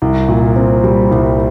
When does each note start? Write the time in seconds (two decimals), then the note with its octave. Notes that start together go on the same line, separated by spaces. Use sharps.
0.02 C2
0.28 A#2
0.56 C4
0.84 G3
1.11 C2